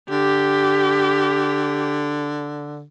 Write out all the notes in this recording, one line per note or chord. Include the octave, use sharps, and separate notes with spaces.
D3 G4